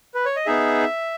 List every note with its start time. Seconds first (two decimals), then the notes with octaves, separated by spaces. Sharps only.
0.14 B4
0.25 C#5
0.36 D#5
0.46 B3 D#4 G#4 E5